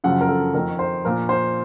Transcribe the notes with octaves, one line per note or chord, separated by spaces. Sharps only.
F#2 C#3 F3 F#5
A#4
A4
F2 D#3 A#4
C5
A#2 F3 A#4
C5